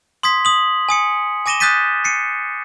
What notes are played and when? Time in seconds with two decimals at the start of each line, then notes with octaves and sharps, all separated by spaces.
0.23 C6 D#6 G#6 B6
0.45 D#6 F#7
0.89 G#5 D#6 C#7
1.46 G#5 D6 A#6 D#7 E7 G7
1.60 D#6 F#6 G6 A6 B6 D#7
2.04 C7 C#7 D#7